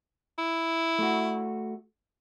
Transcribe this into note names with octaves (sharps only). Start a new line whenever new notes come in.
E4
A3 F#4